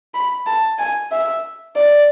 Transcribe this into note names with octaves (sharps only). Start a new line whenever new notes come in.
B5
A5
G#5
E5
D5